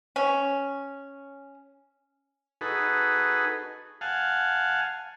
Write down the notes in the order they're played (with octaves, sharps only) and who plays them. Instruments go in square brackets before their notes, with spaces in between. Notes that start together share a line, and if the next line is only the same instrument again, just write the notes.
[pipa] C#4
[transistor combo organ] D#4 F#4 G#4 A4 B4
F5 F#5 G#5 A5